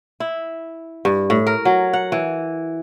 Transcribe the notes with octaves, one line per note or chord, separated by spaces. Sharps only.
E4
G2
A2
A#4
F#3
F#5
E3